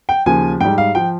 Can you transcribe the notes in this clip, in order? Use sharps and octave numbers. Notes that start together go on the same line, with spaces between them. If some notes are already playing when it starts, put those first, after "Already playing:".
G5
D#2 C#3 F3 G#5
G#2 G3 G5
F5
F3 G5